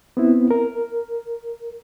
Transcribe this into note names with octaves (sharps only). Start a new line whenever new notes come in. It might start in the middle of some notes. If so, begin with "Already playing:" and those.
B3 C4 E4
A#4